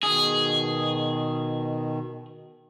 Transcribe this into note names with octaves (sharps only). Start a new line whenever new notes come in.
B2 D#3 G#4